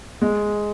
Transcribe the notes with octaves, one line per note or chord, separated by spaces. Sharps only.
G#3